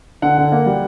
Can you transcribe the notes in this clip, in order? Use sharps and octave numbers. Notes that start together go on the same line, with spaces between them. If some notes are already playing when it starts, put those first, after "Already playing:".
D3 F#5
D3
A#3
G3